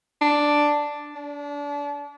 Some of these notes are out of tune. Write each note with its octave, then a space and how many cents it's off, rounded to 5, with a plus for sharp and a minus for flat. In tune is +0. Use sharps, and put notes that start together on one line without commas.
D4 +0
D4 -30